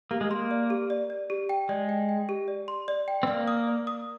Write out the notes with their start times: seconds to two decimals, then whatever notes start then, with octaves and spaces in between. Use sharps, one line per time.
0.11 A#3 G4
0.21 G#3
0.31 A#3 C6
0.51 D5
0.70 G4
0.90 D5
1.10 D5
1.30 G4
1.49 G5
1.69 G#3 D5
1.89 G5
2.09 G5
2.29 G4
2.48 D5
2.68 C6
2.88 D5
3.08 G5
3.23 C4
3.27 A#3 D5
3.48 D#6
3.67 D5
3.87 D#6